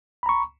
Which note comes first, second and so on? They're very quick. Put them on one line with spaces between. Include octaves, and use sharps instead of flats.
B5 A#5 C#6